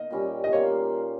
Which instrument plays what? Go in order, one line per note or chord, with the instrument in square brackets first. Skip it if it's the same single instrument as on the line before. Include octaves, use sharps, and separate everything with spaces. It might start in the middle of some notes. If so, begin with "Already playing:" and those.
Already playing: [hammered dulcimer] A#3 D#4 A#4 [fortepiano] D#5
[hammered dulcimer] A#2 G3 C#4 G4
[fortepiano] D#5
[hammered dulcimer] D#3 A#3 F4 [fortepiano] C#5